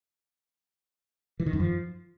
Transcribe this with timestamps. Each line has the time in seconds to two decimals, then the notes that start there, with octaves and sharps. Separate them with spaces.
1.40 E3
1.46 D#3
1.53 F#2
1.60 F3